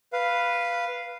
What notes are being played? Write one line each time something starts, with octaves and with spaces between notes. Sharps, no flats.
B4 F5